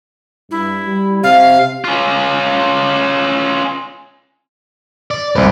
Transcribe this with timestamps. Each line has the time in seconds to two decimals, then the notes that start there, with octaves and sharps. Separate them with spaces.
0.51 G2 E4
0.85 G3
1.23 C3 F5
1.84 C#4 F4
5.11 D5
5.36 C2 G#2 B4 C5